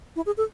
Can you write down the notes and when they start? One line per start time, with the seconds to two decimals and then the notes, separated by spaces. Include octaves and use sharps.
0.16 E4
0.26 G#4
0.37 A4